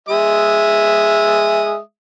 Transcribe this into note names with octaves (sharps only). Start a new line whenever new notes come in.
G#3 E5 D#6